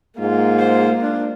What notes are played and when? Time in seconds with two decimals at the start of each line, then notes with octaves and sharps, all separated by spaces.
0.20 G#2 G#3 A#3 F4
0.59 C5
1.02 D4